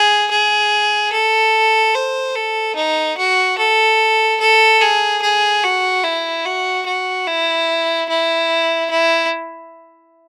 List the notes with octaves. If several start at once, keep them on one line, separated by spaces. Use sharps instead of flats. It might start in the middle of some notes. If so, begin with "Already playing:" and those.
Already playing: G#4
G#4
A4
C5
A4
D#4
F#4
A4
A4
G#4
G#4
F#4
E4
F#4
F#4
E4
E4
E4